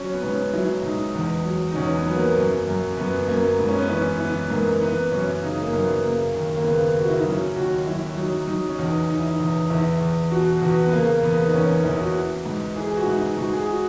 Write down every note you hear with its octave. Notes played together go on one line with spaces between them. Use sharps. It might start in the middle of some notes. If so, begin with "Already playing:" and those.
Already playing: F#3 C#4
B3
G#2 C#4
F#3 E4
G#2 D#4
E2
F#3
D#4
E2 C#4
B3
F#3 B3
A#3
F#2
F#2
F#2 B3
F#2 A#3
G#2 B3
C#4
B3
E3 C#4
E3 B3
G#2 A#3
E3 B3
F#2 C#4
C#3 D#4
A#3
F#2 B3
C#3 A#3
D#2
A#3
C#3 B3
C#3
F#4
E4
D#4
F#3 C#4
D#2 F#4
F#3 E4
F#3 D#4
F#3 D#4
C#4
E2 D#4
E2 D#4
E4
D#4
E2
E2 E4
E2
B2 F#4
E2 F#4
B3
C#3 A#3
E2 B3
D#4
E2 C#4
E2 E4
F#4
E3
G#2
E3 G#4
G#4
F#4
G#2 E4
D#4
G#2 F#4
G#4
F#4